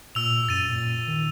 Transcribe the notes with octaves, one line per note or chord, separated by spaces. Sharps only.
A#2 E6 F7
F#2 A6 D#7
A#2
D#3